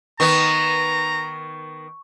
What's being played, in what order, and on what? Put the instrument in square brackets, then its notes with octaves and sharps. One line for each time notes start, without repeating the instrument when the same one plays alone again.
[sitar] D#3 B3 [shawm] A#5 [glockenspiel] C#6